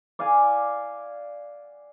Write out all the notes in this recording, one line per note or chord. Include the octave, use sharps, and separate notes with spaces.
D5 F5 F#5 G#5